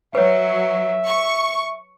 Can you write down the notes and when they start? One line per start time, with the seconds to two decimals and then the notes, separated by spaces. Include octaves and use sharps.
0.15 F#3 B4 C#5 E5
1.07 C#6